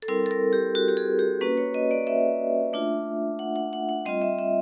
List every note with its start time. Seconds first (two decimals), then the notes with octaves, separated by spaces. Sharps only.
0.02 A4
0.08 G3 C4 E4 A#4
0.26 A4
0.31 A#4
0.53 G4
0.75 F#4
0.88 G4
0.97 G#4
1.19 G4
1.41 A#3 C#4 F#4 B4
1.58 C#5
1.74 D#5
1.91 D5
2.07 E5
2.73 A3 D4 F4
3.39 F#5
3.56 F#5
3.73 F#5
3.89 F#5
4.05 G3 C4 F4 D#5
4.22 E5
4.39 E5